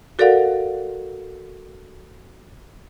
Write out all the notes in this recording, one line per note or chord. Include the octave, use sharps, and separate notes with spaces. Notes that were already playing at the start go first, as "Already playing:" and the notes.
F#4 A4 A#4 D5 F5 F#5